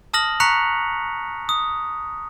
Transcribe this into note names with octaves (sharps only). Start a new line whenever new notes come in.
A5 D#6 F6 A#6 F#7
A#5 C#6 F#6 B6 C#7 F7
D#6